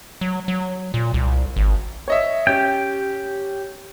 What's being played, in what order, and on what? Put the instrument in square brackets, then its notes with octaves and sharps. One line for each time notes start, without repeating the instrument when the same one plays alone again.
[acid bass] F#3
F#3
A#2
C2
G#1
[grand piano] C#5 D#5 E5
[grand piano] C#4 [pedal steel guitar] G4 G5